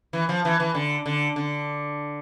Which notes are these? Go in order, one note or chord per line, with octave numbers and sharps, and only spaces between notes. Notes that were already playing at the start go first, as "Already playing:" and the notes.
E3
F3
E3
E3
D3
D3
D3